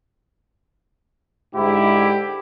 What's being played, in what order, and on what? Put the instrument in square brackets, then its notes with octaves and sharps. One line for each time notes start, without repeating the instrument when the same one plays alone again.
[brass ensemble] G#2 D3 E4 [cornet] G4